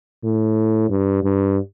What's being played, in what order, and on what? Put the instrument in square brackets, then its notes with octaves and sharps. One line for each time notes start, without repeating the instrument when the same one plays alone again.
[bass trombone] A2
G2
G2